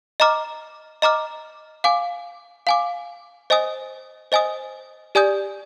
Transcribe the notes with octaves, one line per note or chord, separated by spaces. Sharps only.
D#5 A#5 D6 F6
D#5 A#5 D6 F6
F5 G#5 D6
F5 G#5 D6
C5 D#5 G#5 D#6
C5 D#5 G#5 D#6
G4 D5 G#5 D#6 G6